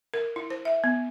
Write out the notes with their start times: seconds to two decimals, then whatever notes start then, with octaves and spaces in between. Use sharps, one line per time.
0.14 A#4
0.36 E4
0.50 C5
0.65 E5
0.84 B3